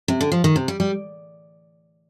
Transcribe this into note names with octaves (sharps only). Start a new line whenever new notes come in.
C3
D3
F3
D#3
C3
G3
G3